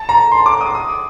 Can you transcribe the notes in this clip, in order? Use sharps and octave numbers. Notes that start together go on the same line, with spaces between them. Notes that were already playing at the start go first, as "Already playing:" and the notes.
Already playing: A5
A#5
C6
D6
D#6
D#6